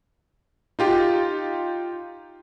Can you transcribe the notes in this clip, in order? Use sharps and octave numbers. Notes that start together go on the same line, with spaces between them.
D#4 F4 G4